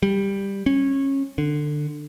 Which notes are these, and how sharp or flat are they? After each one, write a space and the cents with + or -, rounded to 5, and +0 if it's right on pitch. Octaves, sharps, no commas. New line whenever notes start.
G3 +10
C#4 -20
D3 +20